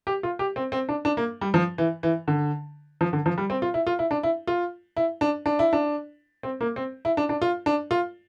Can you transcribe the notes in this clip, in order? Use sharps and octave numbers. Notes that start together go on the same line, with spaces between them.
G4
F4
G4
C4
C4
D4
D4
A#3
G3
F3
E3
E3
D3
F3
D3
F3
G3
C4
F4
E4
F4
E4
D4
E4
F4
E4
D4
D4
E4
D4
C4
A#3
C4
E4
D4
D4
F4
D4
F4